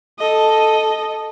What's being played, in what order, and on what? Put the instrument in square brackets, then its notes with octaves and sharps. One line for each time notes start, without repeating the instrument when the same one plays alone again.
[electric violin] A4 D#5